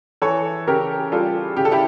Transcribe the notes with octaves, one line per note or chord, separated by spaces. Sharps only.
E3 A4 C#5
C#3 G4 A#4
G3 F4 A4
C#3 G4
A4
E4 G4